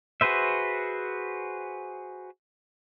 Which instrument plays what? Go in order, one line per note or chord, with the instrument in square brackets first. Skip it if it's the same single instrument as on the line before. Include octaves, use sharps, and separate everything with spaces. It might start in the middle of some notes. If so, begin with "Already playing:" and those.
[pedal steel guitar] F#4 G#4 B4 C5 E5